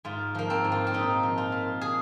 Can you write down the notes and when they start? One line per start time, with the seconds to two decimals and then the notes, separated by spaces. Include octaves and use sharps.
0.05 G#2 F4
0.35 F3 A#3
0.50 C4
0.65 G#2
0.72 F4
0.87 C4
0.93 A#2 D#4
1.23 F3
1.38 F4
1.52 A#2
1.81 G#4